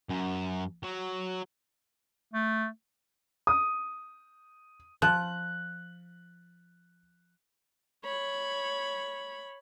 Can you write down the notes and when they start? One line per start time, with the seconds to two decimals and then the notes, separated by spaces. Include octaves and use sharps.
0.09 F#2
0.83 F#3
2.33 A3
3.47 D#6
5.02 F3 F#6
8.05 C#5 B5